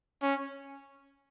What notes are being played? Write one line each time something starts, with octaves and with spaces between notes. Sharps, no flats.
C#4